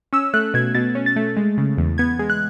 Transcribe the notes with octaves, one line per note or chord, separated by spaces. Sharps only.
C#4 E6
A3 F#6
B2 G#6
B2 A6
C#4
A6
A3
G#3
C#3
E2
B3 G#6
G#3
F#6